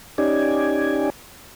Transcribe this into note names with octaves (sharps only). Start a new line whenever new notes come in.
C#4 D#4 G4 D5 G#5